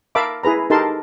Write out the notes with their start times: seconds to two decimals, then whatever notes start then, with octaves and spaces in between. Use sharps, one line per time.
0.15 A#4 E5 F5 A5 B5 D6
0.43 E4 G#4 B4 A#5
0.70 D#4 G4 A4 A#4 A5 C6